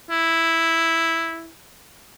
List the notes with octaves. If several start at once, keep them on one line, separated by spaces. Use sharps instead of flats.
E4